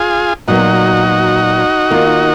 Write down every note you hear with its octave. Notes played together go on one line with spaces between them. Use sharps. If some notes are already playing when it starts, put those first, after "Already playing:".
Already playing: F4 G#4
A#2 F#3 B3 D#4 F#4
D#3 A#3 F4